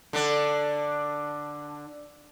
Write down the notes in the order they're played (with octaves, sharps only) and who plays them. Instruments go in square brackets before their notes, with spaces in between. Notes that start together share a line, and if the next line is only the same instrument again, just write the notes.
[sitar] D3 D4